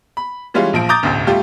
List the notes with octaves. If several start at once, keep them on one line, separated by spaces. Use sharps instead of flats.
B5
E3 G3 G#3 C#4 F4
A#1 F3 D7
A#5 D6 D#6 G6 A6
E1 A1 D2
G3 A3 F4 G4